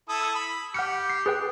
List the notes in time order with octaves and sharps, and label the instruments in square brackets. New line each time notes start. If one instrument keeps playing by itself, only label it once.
[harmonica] E4 A4 D#6
B5
[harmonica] G4 [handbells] F#5 F6 C#7
[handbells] C7
G#4 B4 G5